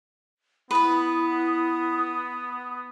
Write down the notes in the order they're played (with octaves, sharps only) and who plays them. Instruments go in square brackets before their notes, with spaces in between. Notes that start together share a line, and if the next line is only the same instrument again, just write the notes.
[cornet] B3 [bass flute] E4 [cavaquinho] B4 B5 [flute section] D#6